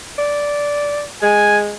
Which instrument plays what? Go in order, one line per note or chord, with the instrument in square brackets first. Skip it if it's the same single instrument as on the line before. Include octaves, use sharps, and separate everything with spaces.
[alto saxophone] D5
[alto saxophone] G#3 [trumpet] G#5